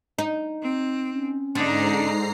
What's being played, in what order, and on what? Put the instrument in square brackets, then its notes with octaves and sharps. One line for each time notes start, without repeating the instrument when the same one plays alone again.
[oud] D#4
[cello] C4
[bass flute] C#4
[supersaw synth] G#2 A#5 C7 [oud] D3 [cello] D4 D#4